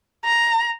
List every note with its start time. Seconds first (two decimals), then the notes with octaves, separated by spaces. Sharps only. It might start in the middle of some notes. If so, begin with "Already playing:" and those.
0.25 A#5